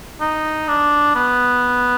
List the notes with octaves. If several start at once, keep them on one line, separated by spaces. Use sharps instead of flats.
D#4
D4
B3